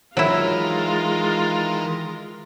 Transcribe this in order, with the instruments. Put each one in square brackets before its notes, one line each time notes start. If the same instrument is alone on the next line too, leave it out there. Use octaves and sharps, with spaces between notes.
[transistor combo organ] D#3 E3 A#4 [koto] F#3 E4 [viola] G#3 F4